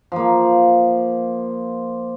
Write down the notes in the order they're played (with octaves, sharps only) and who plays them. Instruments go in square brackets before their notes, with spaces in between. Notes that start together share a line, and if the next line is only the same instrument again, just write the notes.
[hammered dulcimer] F3 A#3